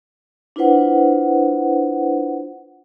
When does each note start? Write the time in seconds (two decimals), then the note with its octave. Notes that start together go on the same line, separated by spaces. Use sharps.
0.56 D4 E4 F4 B4 C5 F#5